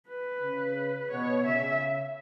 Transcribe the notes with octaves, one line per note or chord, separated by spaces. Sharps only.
B4
C#3
B2 C#5
C#3 E5